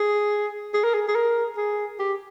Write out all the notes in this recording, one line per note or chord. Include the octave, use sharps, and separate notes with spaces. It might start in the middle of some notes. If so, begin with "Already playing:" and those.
Already playing: G#4
G#4
A#4
G#4
G#4
A#4
G#4
G4